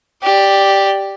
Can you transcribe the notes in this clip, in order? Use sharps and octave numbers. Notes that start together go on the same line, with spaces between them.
G4 D5